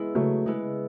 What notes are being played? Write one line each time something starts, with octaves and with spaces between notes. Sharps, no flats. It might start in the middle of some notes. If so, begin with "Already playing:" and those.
Already playing: G#3 B3 E4
C#3 F#3 A3
G#3 B3 E4